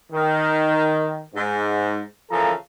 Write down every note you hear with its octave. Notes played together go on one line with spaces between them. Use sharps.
D#3
G#2
C#3 E3 F3 A4 A#4 A#5